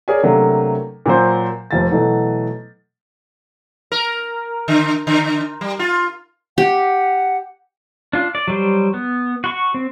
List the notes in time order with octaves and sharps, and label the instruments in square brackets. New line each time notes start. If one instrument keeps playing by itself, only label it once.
[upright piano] G#4 A#4 C#5 D5 G#5
C3 F#3 A3 A#3 D4
A#2 F#3 C5
F1 F2 A6
B2 E3 F#3 A3
[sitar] A#4
D3
D3
G3
F4
[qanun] G4 [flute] F#5
[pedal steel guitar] D4 F4
D5
F#3 G3 C5
B3
F#4 C6 C#6
C4